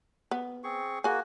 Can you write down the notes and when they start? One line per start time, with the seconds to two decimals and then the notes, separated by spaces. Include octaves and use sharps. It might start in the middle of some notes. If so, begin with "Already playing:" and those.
0.31 B3
0.64 C4 G#4 C#6
1.04 A#3 F#4 G#4 G#5